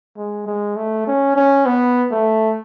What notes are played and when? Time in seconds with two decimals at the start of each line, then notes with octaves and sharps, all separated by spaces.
0.17 G#3
0.47 G#3
0.76 A3
1.07 C#4
1.36 C#4
1.66 B3
2.11 A3